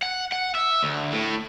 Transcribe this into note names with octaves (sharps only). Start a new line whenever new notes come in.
F#5
F#5
E5
D2
A2